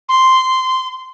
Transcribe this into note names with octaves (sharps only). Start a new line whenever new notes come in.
C6